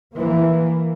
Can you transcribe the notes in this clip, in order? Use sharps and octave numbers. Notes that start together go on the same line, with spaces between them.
E3 A#3